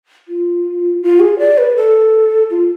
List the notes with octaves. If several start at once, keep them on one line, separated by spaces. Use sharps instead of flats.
F4
F4
G#4
D5
B4
A4
F4